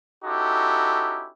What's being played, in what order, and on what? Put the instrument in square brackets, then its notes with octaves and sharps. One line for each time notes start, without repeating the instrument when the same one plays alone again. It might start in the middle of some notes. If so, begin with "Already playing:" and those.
[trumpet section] C#4 D#4 E4 F#4 G4 A4